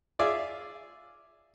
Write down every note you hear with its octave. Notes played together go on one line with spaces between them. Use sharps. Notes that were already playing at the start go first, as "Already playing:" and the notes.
F4 G#4 D5 E5